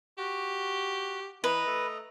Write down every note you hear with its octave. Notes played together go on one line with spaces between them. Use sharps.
F#4 G4
E3 B4 D#5 A#5
A3